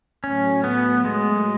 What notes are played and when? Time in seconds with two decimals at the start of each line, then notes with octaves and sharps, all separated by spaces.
0.23 A2 F#3 A3 C#4
0.64 B3
1.05 G#3